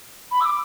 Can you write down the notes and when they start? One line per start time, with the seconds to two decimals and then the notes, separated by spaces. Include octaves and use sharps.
0.31 B5
0.40 E6
0.45 D6